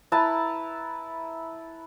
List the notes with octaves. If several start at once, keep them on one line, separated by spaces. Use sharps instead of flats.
E4 B4 A5 A#5